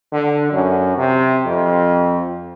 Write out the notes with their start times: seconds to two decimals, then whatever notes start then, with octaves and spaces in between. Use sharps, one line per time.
0.12 D3
0.52 F#2
0.97 C3
1.45 F2